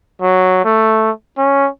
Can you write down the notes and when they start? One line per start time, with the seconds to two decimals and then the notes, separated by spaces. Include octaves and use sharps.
0.22 F#3
0.65 A3
1.38 C#4